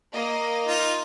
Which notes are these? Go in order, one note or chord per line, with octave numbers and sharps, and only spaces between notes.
A#3 D#5
D#4 F4